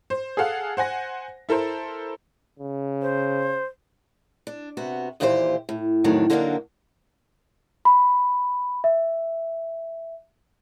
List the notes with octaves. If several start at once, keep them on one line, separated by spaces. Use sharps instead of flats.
C5
G#4 A4 F5 F#5
C5 F#5 G#5 A#6
E4 A4 A#4 C5
C#3
C5
D4
C3 B3 F#4
D#2 A#2 E3 G4 A4 C5
A2
F2 A2 D#3 F#3 D4
D3 F#3 A#3 D4 D#4 F#4
B5
E5